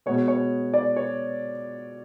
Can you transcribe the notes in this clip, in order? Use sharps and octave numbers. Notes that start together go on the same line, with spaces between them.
B2 G#3 B3 C#5
C#5
D5
C#5